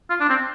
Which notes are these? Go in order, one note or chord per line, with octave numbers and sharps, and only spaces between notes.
F4
D4
C4